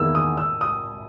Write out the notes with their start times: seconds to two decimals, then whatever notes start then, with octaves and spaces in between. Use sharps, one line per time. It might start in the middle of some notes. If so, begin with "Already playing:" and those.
Already playing: E2 D#3 A#3 E4 G#4 E6
0.15 D#6
0.37 E6
0.61 D#6